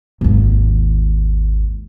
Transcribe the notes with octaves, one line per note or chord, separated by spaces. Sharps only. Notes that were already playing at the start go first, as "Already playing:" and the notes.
G#1 D#2